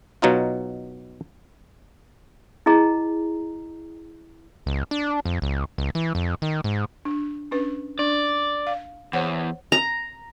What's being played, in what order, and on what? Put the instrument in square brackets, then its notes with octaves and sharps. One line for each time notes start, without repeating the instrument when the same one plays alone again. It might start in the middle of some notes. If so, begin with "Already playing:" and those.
[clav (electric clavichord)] B2 F#3 D#4 F4
[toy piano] E4 G#4 D#5 A#5
[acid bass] C#2
D4
F2
C#2
C#2
E3
F2
D#3
G#2
[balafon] D4
C#4 D4 B4
[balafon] D4 [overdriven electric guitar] D5
[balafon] F5
[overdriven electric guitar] E2 [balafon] C5 C#5 F#5
[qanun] A#5